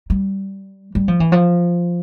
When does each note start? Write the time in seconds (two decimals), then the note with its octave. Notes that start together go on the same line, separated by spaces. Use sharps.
0.10 G3
0.95 G3
1.08 F3
1.20 E3
1.32 F3